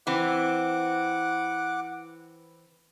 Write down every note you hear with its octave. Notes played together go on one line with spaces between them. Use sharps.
E3 C4 F#5 D6